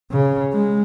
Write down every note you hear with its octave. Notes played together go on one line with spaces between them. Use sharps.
C#3
G#3